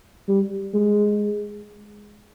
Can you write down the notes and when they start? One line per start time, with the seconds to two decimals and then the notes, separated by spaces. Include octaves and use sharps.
0.28 G3
0.74 G#3